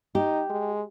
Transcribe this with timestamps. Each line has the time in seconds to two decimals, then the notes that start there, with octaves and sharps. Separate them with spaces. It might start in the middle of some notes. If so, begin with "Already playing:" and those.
0.15 D#4 G4
0.50 G#3